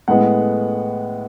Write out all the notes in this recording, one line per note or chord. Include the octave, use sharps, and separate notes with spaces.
A2 G#3 B3 F#5